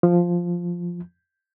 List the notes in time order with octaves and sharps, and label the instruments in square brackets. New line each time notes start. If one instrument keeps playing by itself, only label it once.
[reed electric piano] F3